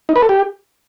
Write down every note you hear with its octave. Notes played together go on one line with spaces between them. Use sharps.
D#4
B4
A4
G4